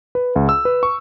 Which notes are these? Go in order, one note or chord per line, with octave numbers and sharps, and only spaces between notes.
B4
C#2
E6
B4
C#6